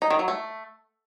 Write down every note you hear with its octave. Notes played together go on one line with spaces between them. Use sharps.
D#4
D#3
F#3
A3